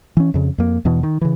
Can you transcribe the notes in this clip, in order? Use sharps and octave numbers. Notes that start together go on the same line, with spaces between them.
E3 C#4
F2 C#3
F2 A#3
E2 B2 E3
D#3
C#3 E3